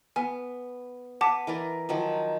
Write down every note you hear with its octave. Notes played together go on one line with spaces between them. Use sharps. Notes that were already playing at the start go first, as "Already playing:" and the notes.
B3 G#5
B4 F#5 A5 D6
E3 A#4 D5
D#3 F3 F#3